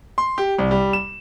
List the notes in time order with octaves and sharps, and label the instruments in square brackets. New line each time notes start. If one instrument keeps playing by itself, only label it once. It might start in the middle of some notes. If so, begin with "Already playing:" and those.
[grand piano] C6
G4
C2
G3
E7